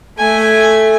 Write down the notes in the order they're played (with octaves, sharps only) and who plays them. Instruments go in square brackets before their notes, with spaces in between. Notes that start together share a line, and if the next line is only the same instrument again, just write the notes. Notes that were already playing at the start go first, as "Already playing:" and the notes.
[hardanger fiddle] A3 G#5